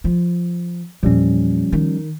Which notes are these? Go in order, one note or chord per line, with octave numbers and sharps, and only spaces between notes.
F3
E2 A#2 F3 G3 C#4
D#3